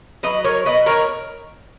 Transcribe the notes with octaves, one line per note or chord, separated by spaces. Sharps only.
F#3 B4 D#5
A#4 C#5
B2 B4 D#5
A#4 C#5